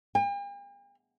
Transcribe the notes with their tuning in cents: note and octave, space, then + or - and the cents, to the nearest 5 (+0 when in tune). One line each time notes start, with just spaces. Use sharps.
G5 +45